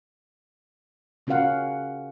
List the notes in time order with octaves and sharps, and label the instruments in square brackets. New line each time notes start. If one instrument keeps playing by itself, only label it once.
[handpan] C#3 C#4 F#4 A#4 F5 F#5